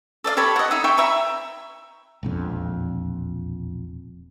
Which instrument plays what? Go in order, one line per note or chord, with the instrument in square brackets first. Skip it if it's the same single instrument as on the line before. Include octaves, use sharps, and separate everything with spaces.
[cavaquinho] A4 D5 E5 F5
G4 A4 C#5 B5
D#5 F#5
D#4 E5
E5 G5 C6 C#6
E5 A#5 B5
[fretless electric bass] E1 A#1 F2